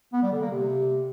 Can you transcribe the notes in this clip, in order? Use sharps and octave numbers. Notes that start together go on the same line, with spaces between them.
B3
G3
D3
A#3
C3